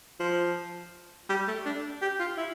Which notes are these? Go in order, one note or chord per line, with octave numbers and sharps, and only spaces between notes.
F3
G3
A3
D4
G4
F4
E4